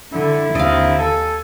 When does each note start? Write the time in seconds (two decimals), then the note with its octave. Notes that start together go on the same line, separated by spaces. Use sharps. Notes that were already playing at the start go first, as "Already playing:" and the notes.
0.13 D3 E4
0.55 D#2 D3 C4 D#5 F5
0.99 A4 G#5